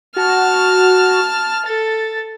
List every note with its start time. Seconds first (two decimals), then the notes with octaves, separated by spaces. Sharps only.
0.16 F#4 A5 F6
1.66 A4 A6